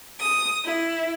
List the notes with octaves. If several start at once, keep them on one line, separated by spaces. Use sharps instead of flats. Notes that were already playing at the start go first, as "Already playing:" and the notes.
D#6
E4